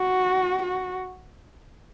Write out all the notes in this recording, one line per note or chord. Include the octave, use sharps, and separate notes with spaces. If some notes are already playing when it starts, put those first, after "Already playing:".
Already playing: F#4
F#4